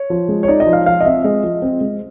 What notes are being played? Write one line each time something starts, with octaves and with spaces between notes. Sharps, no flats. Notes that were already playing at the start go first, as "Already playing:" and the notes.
Already playing: C#5
F3
G#3
C#5
D#4 D5
D#5
F3
F5
F3 F5
D#5
C4 E5
G#3 D#5
F3
C4
G#3